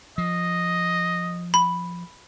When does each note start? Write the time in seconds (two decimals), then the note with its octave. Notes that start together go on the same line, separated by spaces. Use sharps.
0.18 F3 D#5
1.54 B5